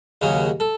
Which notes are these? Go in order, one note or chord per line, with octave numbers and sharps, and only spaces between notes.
D#2 C#3 F#3
A4